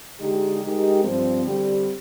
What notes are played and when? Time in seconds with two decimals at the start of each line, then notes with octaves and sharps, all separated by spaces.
0.18 D3 G#3 D#4 G4
0.61 G#3 D#4 G4 A#4
1.03 G2 F3 C4
1.45 D3 G3 C4 G4